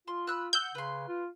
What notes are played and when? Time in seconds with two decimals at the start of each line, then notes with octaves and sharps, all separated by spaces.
0.08 F4 C6
0.27 B5 E6 F#6
0.53 F#5 E6 G6
0.75 C#3 B4 C6
1.08 F4